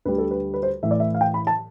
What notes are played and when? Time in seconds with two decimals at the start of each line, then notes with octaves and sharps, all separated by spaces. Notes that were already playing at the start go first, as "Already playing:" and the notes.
0.05 D2 D3 G3 B4
0.18 A4
0.31 B4
0.54 B4
0.63 C5
0.83 A2 E3 A3 E5
0.91 D5
1.00 E5
1.15 F5
1.21 G5
1.34 B5
1.47 A5